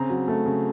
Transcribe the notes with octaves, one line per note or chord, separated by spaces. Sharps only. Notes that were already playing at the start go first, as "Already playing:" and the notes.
Already playing: C#3 C4 A#5
F#3
A3
C#3